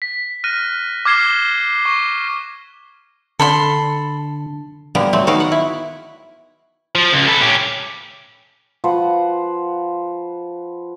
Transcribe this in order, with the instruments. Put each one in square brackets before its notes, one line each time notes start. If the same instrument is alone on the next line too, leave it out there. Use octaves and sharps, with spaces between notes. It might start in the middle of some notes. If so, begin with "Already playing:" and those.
[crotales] B6
F6 F#6 A#6 D#7
D6 F6 G#6 C7 E7 G7
C#6
[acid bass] D3 [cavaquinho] A4 B5 C6
[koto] D3 G3 A#3 B3
F#3 A3 C4
D#3 B3 F#4 A#4 F5
F#5
E4
[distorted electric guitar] F3
C#2
A4 B4
C#4 G4
[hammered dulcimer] F3 B4 C5 F#5